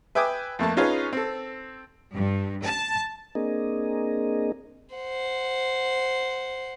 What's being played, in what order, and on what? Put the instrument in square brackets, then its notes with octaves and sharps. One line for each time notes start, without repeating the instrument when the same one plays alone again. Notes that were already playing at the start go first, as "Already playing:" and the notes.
[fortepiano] B4 E5 G5 G#5 D6 D#6
F2 A3 A#3 A5
C#4 D#4 F4 G#4 B4 C#5
C4 A4
[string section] G2
A5
[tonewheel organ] A#3 C4 D4 G#4 A#4 D#5
[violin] C5 F#5